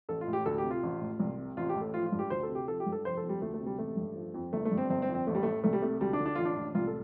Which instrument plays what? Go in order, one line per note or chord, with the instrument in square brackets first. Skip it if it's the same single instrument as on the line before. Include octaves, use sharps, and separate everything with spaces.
[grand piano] A1 A4
F4
A2
G4
D2 A4
G4
C3
F4
A1
A2
C2
C3
A1 F4
G4
A2
A4
F3 F4
F4
G2
G4
D2 C5
A4
C3
G4
F3 A4
G4
G2
A4
F1 C5
A4
F2
G3
D2 A3
A3
C3
G3
A1 A3
G2
F3
F2
G1 A3
A3
G2
C4
G1 C4
C4
F2
C4
A1 A3
G3
A2 A3
C2 A3
G3
C3 A3
D2 G3
D4
D3
D4
A1 F4
D4
A2
C2 F4
A4